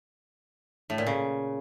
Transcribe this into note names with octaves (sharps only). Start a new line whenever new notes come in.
A2
A#2
C#3